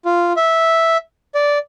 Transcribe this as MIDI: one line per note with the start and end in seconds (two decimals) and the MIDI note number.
0.05 0.33 65
0.37 0.97 76
1.35 1.58 74